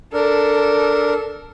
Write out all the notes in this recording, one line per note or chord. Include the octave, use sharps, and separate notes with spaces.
D4 A4 A#4